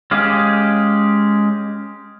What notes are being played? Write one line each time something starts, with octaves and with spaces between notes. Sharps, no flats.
G#3 C#4 G4 G#4 F5